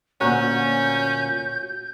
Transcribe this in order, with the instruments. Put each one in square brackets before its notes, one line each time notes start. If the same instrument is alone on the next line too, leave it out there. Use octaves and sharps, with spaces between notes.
[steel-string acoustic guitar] D2 A#2 A#5 [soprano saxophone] C#4 [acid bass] F#4 [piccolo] G6